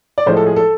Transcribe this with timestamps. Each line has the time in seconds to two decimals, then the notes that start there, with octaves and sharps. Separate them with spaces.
0.18 D5
0.26 A2 F3 G#3 C5
0.37 A4
0.46 G#4
0.56 A4